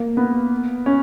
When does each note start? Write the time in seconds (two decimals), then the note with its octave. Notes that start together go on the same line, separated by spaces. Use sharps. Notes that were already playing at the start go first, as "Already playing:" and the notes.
Already playing: A#3
0.17 B3
0.86 C#4